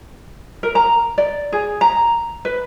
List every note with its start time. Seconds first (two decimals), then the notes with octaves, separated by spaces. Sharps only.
0.63 A#4
0.75 A#5
1.18 D5
1.53 G#4
1.81 A#5
2.45 B4